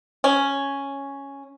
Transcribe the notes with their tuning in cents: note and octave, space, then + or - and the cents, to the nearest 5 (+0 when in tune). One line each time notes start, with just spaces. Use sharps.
C#4 +0